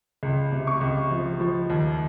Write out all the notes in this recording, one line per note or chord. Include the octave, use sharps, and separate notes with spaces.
C#2
C3
C#6
C#2
F3
F3
D#2